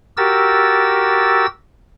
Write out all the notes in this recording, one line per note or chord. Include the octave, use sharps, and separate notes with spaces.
F#4 G4 A#4 E6 A6